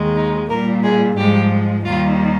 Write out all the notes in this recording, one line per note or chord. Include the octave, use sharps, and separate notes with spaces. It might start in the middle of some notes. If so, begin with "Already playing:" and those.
Already playing: D#2 D#3 G#3
D#4
A#2 G3 A#3 A#4
G#3 G#4
G#2 F3 G3 G#3 G4
D#2 D#3 G3 F4